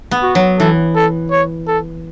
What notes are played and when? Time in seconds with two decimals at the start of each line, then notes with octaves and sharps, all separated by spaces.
0.11 B3
0.23 F#4
0.35 F#3
0.59 E3 A4
0.95 A4
1.31 C#5
1.68 A4